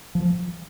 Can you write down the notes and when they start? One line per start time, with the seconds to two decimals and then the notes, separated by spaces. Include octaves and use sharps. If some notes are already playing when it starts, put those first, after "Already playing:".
0.15 F3